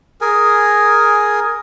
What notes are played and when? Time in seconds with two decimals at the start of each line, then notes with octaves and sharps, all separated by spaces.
0.21 G#4 A#4 G#5